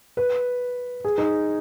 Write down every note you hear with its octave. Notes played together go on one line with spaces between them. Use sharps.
B4
G#4
D#4